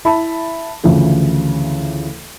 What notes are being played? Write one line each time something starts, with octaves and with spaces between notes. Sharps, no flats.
E4 E5 A5 B5
D2 C#3 E3 F3